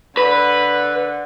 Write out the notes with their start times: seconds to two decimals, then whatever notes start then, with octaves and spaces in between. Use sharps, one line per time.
0.17 D3 B4